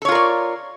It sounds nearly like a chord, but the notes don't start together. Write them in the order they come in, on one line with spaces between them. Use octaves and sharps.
A4 C#5 F4 A#4 D5